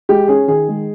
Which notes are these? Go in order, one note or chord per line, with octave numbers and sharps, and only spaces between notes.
G#3 G4
C#4 G#4
D#3 G#4
G#3